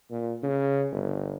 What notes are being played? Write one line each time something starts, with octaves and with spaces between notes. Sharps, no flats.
A#2
C#3
G1